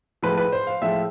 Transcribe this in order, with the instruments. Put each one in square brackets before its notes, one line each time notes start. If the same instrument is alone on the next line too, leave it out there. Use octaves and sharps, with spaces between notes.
[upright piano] A2 F3 G#3 B4
B4
C5
F5
A2 F3 G#3 E5